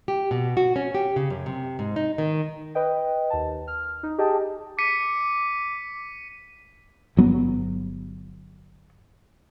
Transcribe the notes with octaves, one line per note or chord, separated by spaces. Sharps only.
G4
B2
F#4
C#4
G4
C#3
F#2
C3
G#2
D#4
D#3
B4 D#5 G5
D#2 A5
F6
D#4
G4 G#4 D#5 G5 A5
D6 B6 C#7 D#7
G1 F#3 B3